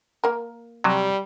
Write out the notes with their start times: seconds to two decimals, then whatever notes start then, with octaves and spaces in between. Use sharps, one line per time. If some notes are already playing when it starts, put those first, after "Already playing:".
0.24 A#3 A#4
0.84 C3 F#3 G3